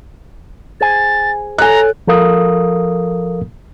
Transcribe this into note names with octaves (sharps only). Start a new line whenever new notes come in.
G#4 C5 G#5 A6
A4 C#5 G#5 A#5 F#6
F3 A4 A#4 F5 D#6